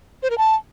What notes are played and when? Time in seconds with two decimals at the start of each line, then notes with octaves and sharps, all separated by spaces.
0.23 C5
0.30 A#4
0.38 A5